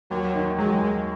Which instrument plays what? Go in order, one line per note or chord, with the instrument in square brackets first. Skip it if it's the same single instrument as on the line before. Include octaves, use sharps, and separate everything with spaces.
[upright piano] D#2 [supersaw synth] F#3
[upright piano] D#3
[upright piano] F#3 [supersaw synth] G#3
[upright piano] D#2